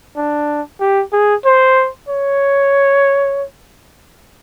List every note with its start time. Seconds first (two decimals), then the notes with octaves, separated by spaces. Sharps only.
0.17 D4
0.80 G4
1.13 G#4
1.45 C5
2.09 C#5